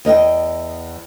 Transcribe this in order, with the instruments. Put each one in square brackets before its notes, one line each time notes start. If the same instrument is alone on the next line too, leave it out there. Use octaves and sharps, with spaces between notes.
[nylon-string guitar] E2 D#5 F5 G5